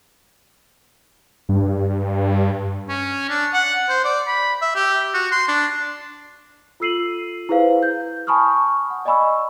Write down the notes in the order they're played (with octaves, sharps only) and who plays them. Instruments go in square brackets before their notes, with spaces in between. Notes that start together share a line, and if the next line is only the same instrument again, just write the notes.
[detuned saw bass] G2
[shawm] C#4
D4
F#5
C5
D5
B5
E5
G4
F#4
C6
D4
[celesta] F4 A4 E6 C7 D#7 F#7
E4 G#4 B4 C5 F5
G6
G#5 A5 B5 C#6 D#6 F6
F#5
D5 D#5 G#5 B5 C#6 E6